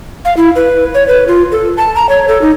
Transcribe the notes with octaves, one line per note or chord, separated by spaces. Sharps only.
F5
E4
B4
C#5
B4
F4
A4
A5
A#5
C#5
A4
D#4